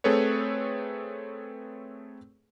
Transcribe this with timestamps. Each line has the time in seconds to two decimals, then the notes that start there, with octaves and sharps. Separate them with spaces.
0.04 A3 C4 G#4 A4 B4 C#5